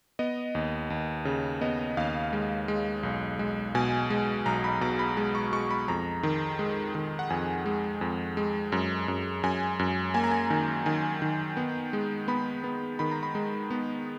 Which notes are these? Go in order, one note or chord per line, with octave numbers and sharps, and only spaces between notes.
B3 D#5
D#2
D#2
C#3
B3 D#5
D#2 F5
G#3
G#3
B1
G#3
B2 G#5
G#3
B1 A#5
B5
B2 A#5
B5
G#3
C#6
G#3 C#6
B5
F2 A#5
D#3
G#3
D#3
F#5
F2 G#5
G#3
F2
G#3
F#2
F#2
F#2 G#5
F#2
A#3 G#5
A#5
G#5
D#3
D#3 G#5
D#3
B3
G#3
B3 B5
B3
D#3 B5
A#5
B5
G#3
B3